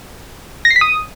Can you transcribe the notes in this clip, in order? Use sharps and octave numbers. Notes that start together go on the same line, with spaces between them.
A#6
C7
B6
D#6